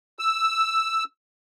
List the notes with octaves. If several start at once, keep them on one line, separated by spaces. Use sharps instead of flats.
E6